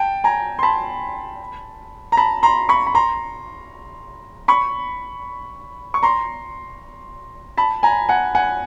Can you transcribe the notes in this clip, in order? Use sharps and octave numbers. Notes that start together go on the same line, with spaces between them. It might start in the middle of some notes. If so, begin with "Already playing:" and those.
Already playing: G5 A5
G#5 A#5
C6
A5 B5
A#5
A5 B5
A#5 C6
B5 C#6
B5
A#5 C6
B5 C#6
C#6
A#5 C6
A5 B5
G#5 A#5
F#5 G#5
F#5 G#5